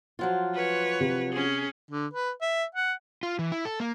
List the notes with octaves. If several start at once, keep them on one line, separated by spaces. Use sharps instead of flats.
F3 F#3 F4
B4 C#5
C3
C#4 G#4
D3
B4
E5
F#5
F4
E3
E4
A4
A#3